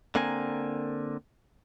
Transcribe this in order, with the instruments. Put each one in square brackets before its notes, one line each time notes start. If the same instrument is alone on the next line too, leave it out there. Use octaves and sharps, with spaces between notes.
[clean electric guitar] D3 A#3 C4 A#4 G#5